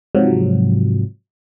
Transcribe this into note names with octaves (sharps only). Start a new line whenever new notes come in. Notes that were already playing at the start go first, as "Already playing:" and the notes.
G#2 C3 F3 F#3